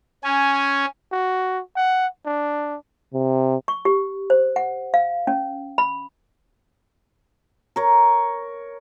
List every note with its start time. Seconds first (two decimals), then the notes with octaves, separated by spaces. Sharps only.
0.24 C#4 G#5
1.12 F#4
1.76 F#5
2.26 D4
3.14 C3
3.68 C#6
3.85 G4
4.30 C5
4.56 F#5
4.94 F5
5.27 C#4
5.78 B5
7.76 A#4 C#5